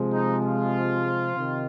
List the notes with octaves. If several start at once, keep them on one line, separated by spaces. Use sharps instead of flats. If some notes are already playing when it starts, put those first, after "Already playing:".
Already playing: C3 F3 G#3
D#4
F4
C3 D#3